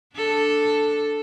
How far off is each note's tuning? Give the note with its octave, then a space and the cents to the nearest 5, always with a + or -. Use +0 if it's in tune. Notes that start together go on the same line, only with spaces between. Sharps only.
D4 +0 A4 +0